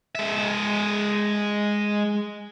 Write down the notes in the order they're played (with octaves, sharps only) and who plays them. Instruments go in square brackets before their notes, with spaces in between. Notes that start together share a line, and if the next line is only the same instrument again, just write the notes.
[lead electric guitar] G#3 E5